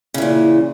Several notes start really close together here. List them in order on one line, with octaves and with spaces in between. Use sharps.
C#3 E3 A#2